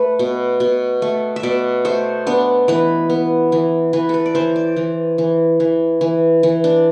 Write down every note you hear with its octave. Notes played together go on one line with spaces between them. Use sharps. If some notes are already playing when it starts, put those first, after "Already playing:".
Already playing: A3 B4
B2
B2
A3
E5
B2 D5
A3 C5
B3 D4
E3 B4
B3
E3
E3 B4
A4 B4
D5
E3 C5
D5
E3
E3
E3
E3
E3
D4